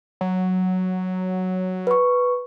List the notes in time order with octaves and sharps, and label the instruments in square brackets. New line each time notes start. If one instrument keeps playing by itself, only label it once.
[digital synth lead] F#3
[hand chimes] B4 C#6